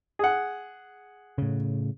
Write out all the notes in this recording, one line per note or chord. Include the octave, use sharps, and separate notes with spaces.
G#4 F#5
A2 C#3